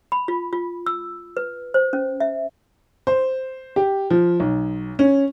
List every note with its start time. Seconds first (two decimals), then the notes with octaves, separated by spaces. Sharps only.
0.12 B5
0.28 F4
0.53 F4
0.86 E6
1.37 B4
1.74 C5
1.93 C#4
2.20 E5
3.07 C5
3.76 G4
4.10 F3
4.40 B1
4.99 C#4